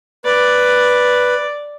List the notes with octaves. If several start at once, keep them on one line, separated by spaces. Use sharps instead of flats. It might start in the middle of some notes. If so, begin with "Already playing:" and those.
B4 D5